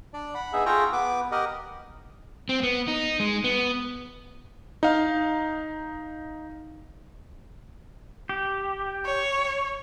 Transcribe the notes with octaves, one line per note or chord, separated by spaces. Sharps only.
D4 D5
F#5 B5
B3 D#4 G#4 E5
F4 G#4 A4 G5 A#5 C#6
B3 B4 D6
G4 A#4 D#5 F#5
C4
B3
D#4
G#3
B3
D#4 F5
G4
C#5